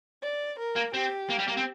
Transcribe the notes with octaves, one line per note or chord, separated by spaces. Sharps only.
D5
A#4
A#3
C4 G4
A#3
G3
A#3
C4